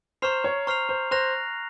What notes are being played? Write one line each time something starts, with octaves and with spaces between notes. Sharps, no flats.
C5 A#5 C#6 F6 C7 F7
C#5
C5 A#5 C#6 F6 C7 F7
C5
C5 F#6 A#6 F7